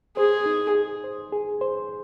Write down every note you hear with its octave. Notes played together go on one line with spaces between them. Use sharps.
G#4 C5
D#4
G#4
C5
G#4
C5